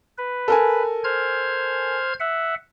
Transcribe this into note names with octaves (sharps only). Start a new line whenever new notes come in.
B4
A4 A#4 G#5
C5 F6 G#6
E5 F#5